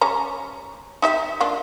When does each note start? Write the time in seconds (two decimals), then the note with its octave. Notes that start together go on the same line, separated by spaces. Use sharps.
0.01 G3 C#4 A#5
1.02 D#4 G4 E5
1.41 A#3 D4 F4